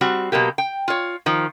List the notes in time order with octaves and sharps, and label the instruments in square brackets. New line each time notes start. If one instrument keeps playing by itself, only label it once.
[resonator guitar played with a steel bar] G3 C4 F#4
B2 F#3 A#3 G4
G5
F4 C#5
D#3 F3